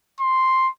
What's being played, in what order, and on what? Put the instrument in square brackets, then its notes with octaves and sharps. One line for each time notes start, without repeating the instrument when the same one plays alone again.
[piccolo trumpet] C6